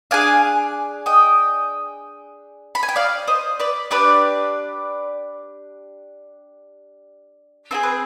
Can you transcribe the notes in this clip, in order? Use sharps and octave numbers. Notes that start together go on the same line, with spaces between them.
D4 G#4 F5 G#5
D#5 G5
B5
G#5
G5
D5 F5
C5 D#5
B4 D5
D4 G4 B4 D5
C4 F4 G#4 C5
B4